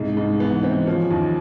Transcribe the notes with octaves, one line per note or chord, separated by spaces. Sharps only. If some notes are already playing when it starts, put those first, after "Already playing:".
Already playing: C2 G#2
G#2
E3 B3
E3 C4
F3 C#4
D#2